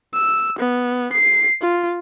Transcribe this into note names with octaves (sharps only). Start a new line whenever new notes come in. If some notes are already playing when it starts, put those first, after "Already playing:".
E6
B3
C7
F4